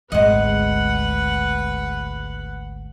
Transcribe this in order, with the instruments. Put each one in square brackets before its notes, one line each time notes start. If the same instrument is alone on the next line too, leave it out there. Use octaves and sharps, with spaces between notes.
[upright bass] G#1 D2 [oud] G#3 D#5 [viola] B4 F#5